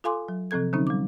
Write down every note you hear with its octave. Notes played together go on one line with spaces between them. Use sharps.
F4 A4 F5 G#5 C6 D6
F#3
C3 F3 C4 A4 G#6
D3 F#3 C4 C#4 D#4
G3 D6